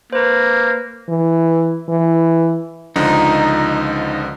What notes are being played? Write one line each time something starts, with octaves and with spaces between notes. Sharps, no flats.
A#3 B4 C5
E3
E3
C#2 D3 F3 D#4